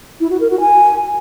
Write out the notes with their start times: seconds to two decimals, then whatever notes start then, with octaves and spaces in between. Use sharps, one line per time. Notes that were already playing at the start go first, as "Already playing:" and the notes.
0.20 E4
0.30 F#4
0.40 A#4
0.50 F#4
0.60 G#5